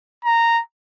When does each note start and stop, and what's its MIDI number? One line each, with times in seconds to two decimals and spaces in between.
0.25 0.61 82